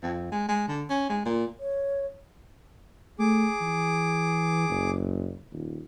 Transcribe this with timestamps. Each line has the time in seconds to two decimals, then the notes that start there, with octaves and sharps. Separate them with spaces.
0.03 F2
0.32 G#3
0.48 G#3
0.68 D3
0.89 C#4
1.10 G#3
1.25 A#2
1.59 C#5
3.19 A3 G#4 D6
3.61 E3
4.69 F#1
5.52 D#1